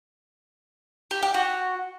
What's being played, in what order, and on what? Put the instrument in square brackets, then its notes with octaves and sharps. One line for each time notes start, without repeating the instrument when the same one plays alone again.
[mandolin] G4
G4
F#4